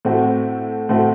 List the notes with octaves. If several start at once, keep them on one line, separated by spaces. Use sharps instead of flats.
A2 A3 C4 F#4
A2 A3 C4 F#4